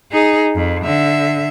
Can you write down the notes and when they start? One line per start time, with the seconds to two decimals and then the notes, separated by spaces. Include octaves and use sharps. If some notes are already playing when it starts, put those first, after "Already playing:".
0.12 D#4 G#4
0.55 F2
0.85 D3 E5